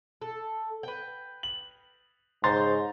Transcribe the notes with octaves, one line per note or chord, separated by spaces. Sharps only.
A4
B4 G5
F#7
G#2 C#3 C5 A#5 C6 A6